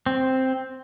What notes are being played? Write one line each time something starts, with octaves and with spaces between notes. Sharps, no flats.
C4